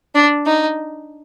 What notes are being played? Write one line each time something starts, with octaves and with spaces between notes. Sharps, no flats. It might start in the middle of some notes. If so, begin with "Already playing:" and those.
D4
D#4